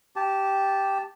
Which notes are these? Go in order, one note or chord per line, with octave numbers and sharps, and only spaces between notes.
G4 A5